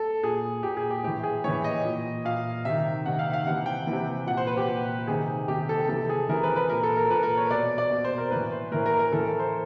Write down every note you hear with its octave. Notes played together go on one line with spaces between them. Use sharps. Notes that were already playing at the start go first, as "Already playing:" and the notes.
Already playing: A4
A#2 G#4
A#2 G4
G#4
G4
A2 E3 G4
G#4
A2 E3 C#5
D#5
A#2
A#2 F5
C3 D#3 E5
C3 D#3 F#5
F5
F5
C3 E3 F#5
G5
C3 E3
A#2 F#5
C5
B4
G4
A#2
C3 D#3 G#4
C3 D#3 G4
A4
C3 E3 A4
G#4
C3 E3 A#4
B4
B4
A#2 A#4
A4
A#4
A#2 B4
A#4
C#5
B2 D5
D5
B2
C5
A#4
A2 E3 B4
C5
A2 E3 A#4
A#4
A#4
A2 E3 A4
A#4
C5